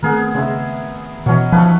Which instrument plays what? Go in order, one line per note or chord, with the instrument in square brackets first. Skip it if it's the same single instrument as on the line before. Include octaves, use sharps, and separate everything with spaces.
[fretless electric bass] D#3 A3 C4 [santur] B3 G#4 A#4
[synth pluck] C#3 [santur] G#3 E5
[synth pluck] B2 E3 [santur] F#3 C#4 D#5
[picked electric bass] F3 [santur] A3 D#4 B4